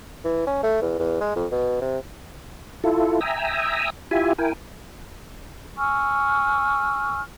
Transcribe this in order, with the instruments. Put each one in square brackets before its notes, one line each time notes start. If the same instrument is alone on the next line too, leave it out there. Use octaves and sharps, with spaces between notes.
[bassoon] E3
C#4
A3
E2
E2
G#3
F2
B2
C3
[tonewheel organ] E4 F4 A4
E5 G5 G#5 A#5 D#6 E6
E4 F4 G4 E5 G#5
E4 A#4 G5 G#5
[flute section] G#5 C#6 E6 F6